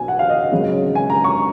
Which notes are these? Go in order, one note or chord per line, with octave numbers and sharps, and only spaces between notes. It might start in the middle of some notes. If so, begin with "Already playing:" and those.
Already playing: B1 B2 F#3 G#5
F#5
F5
D#5
G#1 F#2 C#3 G#3
G#5
A#5
C#6